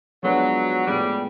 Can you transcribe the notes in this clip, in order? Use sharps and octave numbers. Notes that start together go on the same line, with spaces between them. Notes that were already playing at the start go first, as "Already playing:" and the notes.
F3 F#3 G#3 B3 D4
A2 F3 G3 G#3 B3